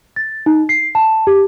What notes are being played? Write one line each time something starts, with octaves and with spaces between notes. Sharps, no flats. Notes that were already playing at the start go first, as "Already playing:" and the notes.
A6
D#4
C7
A5
G4